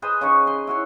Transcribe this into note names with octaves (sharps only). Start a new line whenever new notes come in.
G#4 B4 C5 D#5
C#3 C#4 D#4 C#6
C6
E4 F#4 C#5